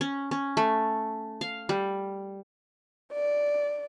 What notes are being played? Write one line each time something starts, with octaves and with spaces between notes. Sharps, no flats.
C#4
C#4
A3
F5
G3
D5